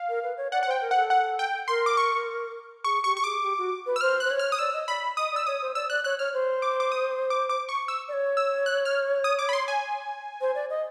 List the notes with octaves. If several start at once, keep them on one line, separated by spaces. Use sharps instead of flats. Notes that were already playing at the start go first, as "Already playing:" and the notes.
Already playing: F5
A#4
B4
C#5
D5 F#5
F#5
C5 G5
A#4
A4 F#5
F#5
G5
A#4 C6
D6
C#6
G#4 C#6
G4 C#6
C#6
G#4 D6
G4
F#4
B4
E6
C5 F6
C5 F#6
C#5
F6
D#6
D5 E6
D#5
D5 B5
D#5 D#6
D5 E6
C#5 D#6
C5
D5 E6
D5 F#6
C#5 F#6
C#5 F6
C5
D6
D6
D#6
D6
D6
C#6
E6
D5
C#5
E6
F#6
F6
D#6
D6
B5
C6
G#5
C5
D5
D#5